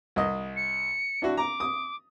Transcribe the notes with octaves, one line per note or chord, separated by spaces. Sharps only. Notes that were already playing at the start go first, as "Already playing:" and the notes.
C2 D#5
C#7
D4 E4 F#4
A#5 D6
D#6